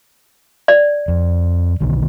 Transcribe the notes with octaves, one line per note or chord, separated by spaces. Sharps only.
D5
F2
B1 D3 D#3